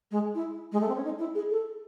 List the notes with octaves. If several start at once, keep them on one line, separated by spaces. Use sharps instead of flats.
G#3
E4
G#3
A3
C4
C#4
D#4
E4
G#4
A4